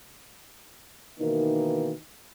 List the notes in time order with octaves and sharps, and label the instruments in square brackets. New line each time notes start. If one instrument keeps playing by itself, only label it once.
[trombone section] B2 D#3 E3 A#3 D#4